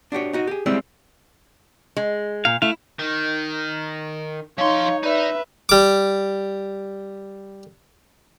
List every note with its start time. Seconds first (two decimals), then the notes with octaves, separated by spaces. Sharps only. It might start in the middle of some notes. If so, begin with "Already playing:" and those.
0.12 D4 F#4 G4 C#5
0.33 D#4 F#4 D#5
0.48 G4 G#4
0.66 G3 G#3 C4 C#4 E4 G4
1.97 G#3
2.45 A#2 F5
2.62 A3 E4 F5
2.99 D#3
4.58 F3 D#4 C#5 F5 C6
5.03 D#4 B4 D5 E5
5.69 G3 D6